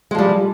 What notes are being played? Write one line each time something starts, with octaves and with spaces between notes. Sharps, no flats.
F3 G3 G#3